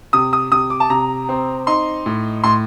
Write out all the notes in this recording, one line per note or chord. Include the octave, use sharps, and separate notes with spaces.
C3 D#6
D#6
C3 D#6
D6
A5
C3 A#5
C4
D#4 C6
A2
A2 C6